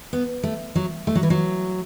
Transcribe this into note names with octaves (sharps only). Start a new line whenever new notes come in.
B3
A3
F#3
A3
F#3
E3
F#3